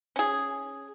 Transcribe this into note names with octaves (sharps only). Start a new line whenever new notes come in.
C#4 G#4